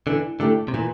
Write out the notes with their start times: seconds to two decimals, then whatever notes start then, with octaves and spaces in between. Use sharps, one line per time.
0.07 D3 E3
0.40 D3 A3 E4 G4
0.68 C3
0.74 A#2 E3